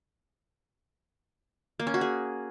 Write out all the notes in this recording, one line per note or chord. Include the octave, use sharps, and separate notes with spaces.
A#3
C#4
F#4
G#4